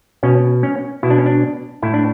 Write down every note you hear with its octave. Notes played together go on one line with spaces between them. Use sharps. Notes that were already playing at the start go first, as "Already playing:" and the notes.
B2 C#4
C#4
B2 E4
D4
C#4
D4
A2 E4
D4